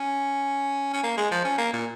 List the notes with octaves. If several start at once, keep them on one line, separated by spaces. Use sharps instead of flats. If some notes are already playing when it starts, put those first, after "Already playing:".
Already playing: C#4
C#4
A#3
G#3
F3
C#4
A#3
A#2